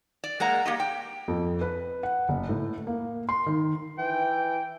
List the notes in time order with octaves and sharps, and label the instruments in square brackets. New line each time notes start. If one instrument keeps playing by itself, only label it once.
[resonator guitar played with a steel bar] D5
G#3 A#3 F#5 A#5
A#3 G4 D#5
G5
[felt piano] F2
B4
F#5
F#1
A2
A#3
C6
D#3
[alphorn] E3 [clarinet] G5